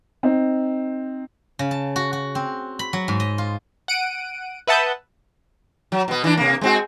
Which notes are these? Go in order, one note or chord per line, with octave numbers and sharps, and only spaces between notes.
C4 D#4
C#3
A5
F#4
F#4
C4
B5
F#3
G#2
D#5
F4
F#5 D7 D#7
B4 E5 F#5 A5 D#6 G6
F#3
B2 B3
E3 D4
C3 A#3
G#3 C4 F#4